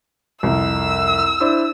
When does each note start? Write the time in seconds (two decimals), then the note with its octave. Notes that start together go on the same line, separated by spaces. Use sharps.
0.43 C2 F2 E6
1.40 D4 E4 C5